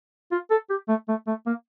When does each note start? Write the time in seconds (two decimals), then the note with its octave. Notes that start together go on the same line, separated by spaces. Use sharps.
0.31 F4
0.50 A4
0.69 G4
0.88 A3
1.08 A3
1.27 A3
1.46 A#3